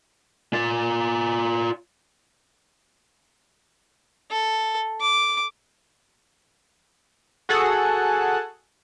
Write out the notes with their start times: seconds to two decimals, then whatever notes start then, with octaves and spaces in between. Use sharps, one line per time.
0.53 F4 D5
4.32 A4
5.02 D6
7.49 F#4 G#4 A4 F#5